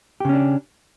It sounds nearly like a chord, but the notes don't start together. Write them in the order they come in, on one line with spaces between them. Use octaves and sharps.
G4 C#3 C#4 D4